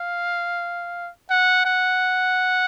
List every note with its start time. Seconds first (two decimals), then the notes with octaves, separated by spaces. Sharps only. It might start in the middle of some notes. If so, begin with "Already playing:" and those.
Already playing: F5
1.30 F#5
1.65 F#5